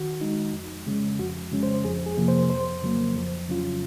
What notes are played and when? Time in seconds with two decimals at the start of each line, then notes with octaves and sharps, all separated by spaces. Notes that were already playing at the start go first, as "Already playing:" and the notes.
Already playing: D#3 F#4
0.21 G#3 D#4
0.53 F2
0.87 C#3 G#3 C#4
1.19 F2 F#4
1.51 C#3 G#3 C#4
1.63 C5
1.85 F2 G#4
2.06 G#4
2.17 C3 F3 A#3
2.28 C5
2.50 F2 C5
2.82 C#3 F#3 A#3
3.15 F2
3.48 C#3 F#3 C#4 F4